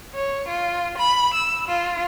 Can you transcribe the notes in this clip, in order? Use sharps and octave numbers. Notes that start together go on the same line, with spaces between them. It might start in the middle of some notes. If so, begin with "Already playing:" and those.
C#5
F4
B5
E6
F4